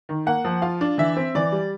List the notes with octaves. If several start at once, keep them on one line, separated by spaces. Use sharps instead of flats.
D#3
A#3 F#5
F3
F4 F5
D4
E3 E5
C4
E3 D5
G3